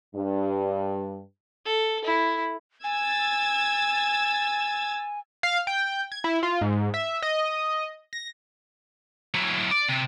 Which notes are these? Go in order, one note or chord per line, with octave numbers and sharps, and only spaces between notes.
G2
A4
E4
G#5 E6 G#6 A6
F5
G5
G#6
E4
F4
G#2
E5
D#5
A#6
F#3 E4
D5
C3